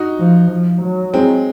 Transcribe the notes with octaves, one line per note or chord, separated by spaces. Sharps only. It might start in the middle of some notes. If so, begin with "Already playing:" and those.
Already playing: D#4 F#4
F3
F3
F#3
G#3 C4